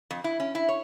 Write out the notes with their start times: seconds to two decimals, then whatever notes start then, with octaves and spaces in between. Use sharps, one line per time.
0.11 F2
0.24 E4
0.40 C#4
0.55 E4
0.69 C#5